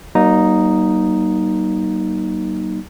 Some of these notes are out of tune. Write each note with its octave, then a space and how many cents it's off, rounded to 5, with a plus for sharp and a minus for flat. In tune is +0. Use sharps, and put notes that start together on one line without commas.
F#3 +45 A#3 +30 D#4 +0